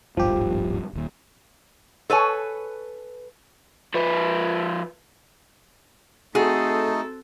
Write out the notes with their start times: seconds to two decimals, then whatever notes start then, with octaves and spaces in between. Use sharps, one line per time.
0.17 D1 G#1 G2 F3 G4
0.93 D#1 D#2
2.10 A4 B4 C#5 G#5
3.95 F3 B4
6.35 A3 C4 D#4 F#4 G#4 A4